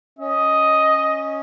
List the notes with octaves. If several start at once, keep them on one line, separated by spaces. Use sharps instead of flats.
C#4 D#5